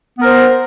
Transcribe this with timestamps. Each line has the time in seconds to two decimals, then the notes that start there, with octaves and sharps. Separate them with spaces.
0.18 B3
0.21 A#4
0.24 C5